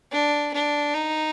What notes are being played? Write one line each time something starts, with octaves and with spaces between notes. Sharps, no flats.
D4
D4
D#4